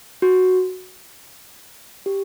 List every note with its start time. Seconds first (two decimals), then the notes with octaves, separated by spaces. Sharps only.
0.22 F#4
2.06 G4